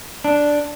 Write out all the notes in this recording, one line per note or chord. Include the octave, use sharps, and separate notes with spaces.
D4